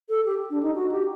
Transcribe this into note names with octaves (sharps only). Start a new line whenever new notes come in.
A4
G4
D4
D#4
F#4
G4